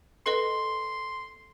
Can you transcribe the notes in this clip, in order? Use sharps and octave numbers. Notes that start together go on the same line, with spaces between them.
A4 B4 D#5 C6